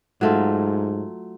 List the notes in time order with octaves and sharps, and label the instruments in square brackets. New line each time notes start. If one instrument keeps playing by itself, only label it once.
[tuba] G#2 [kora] F#3 A3 F4